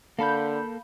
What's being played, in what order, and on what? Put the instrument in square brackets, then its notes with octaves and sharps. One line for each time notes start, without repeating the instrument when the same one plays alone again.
[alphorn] D3 [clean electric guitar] A#3 A4 [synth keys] F5 B5 G6